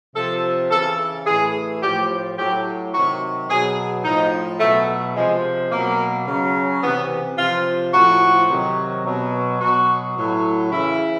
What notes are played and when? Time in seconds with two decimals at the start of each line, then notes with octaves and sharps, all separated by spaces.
0.16 C3 F3 A4
0.71 C#3 E3 A4
1.27 A2 E3 G#4
1.82 A2 F3 G4
2.38 A2 F#3 G4
2.93 C3 D#3 F#3 F#4
3.50 B2 F#3 G#4
4.05 A2 F3 D#4
4.60 B2 F#3 A3
5.16 C3 F3 G#3
5.71 B2 F#3 A#3
6.27 C#3 F#3
6.83 C3 E3 B3
7.38 C3 F3 F4
7.94 A2 F3 F#4
8.49 C3 D#3 F#3
9.05 B2 F#3
9.61 B2 F#3 F#4
10.17 A2 F#3
10.71 C#3 E3 E4